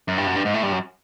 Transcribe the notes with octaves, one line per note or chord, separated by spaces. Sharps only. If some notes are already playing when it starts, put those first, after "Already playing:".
F#2
G2
F#2
G2
G#2
A2
G2
F#2